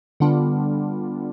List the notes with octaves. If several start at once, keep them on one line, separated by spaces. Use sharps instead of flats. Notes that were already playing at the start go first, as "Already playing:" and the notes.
D3 G3 B3 D4 F4